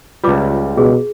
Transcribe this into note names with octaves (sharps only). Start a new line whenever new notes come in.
C#2 G3 F4 B4 D6
B2 G#4